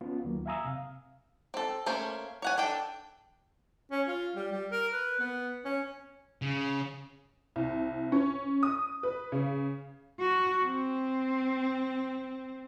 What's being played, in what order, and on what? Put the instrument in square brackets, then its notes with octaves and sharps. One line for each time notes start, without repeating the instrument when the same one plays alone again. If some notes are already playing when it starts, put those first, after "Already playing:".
[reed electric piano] B3 C#4 F4
D2 D#3 F#3 A#3
E5 F5 G#5 A#5 D#6 E6
C3 F5
[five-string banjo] C4 A4
A3 A#3 C#4 C5
C#5 F#5 G#5
D4 A4 G5
[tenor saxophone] C#4
F4
G3
G3
A#4
B4
B3
C#4
[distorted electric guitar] C#3
[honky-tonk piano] C2
C#4
D#6
B4
C#3
[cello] F#4
C4